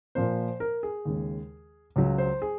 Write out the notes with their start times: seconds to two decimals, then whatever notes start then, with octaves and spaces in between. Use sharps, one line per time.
0.15 A#2 F3 A#3 C5
0.60 A#4
0.83 G#4
1.05 D#2 C#3 G#3
1.96 C#2 C#3 F#3
2.18 C5
2.42 G#4